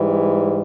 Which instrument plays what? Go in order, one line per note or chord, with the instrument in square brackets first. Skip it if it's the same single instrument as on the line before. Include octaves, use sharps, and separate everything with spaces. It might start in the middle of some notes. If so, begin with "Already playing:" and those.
Already playing: [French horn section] G#2 E3 G3